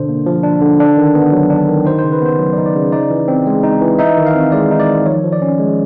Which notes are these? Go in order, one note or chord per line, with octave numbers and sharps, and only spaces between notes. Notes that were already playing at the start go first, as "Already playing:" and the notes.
Already playing: B2 D3 D4 C5
A#3
F3
D4
D3
D4
D#3
B3
F#3
D4
D#3
D#4 C5
C5
C#3
B4
B3 C5
F#3
D5
D#4
D5
C#3
D#4 D5
E3
C4
G#3
D#4
E3
D#4 E5
D#3
F5
C4
G#3 D5
D#4
D5
D#3
F3 C#5
F3
D5
C#4
G#3